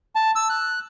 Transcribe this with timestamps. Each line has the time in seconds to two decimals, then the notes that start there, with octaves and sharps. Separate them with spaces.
0.15 A5
0.36 E6
0.50 F#6